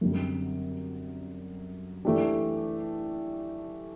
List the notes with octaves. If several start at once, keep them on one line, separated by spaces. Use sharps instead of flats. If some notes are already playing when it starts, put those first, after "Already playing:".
F#2 D3 G3 C4
E3 A3 D4 G4